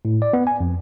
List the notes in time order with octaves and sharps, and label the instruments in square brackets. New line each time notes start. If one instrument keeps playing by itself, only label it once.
[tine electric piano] A2
D5
B3
G#5
F2